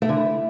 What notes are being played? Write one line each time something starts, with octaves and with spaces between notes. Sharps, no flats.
A3
D3
E4